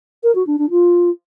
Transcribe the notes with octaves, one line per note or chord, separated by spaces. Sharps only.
A#4
F#4
D4
D4
F4